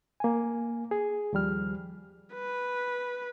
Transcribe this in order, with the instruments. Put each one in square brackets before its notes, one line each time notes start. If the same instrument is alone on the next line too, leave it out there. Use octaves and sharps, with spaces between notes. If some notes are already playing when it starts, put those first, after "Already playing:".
[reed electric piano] A#3 G#5
G#4
D#2 F3 G3 F6
[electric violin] B4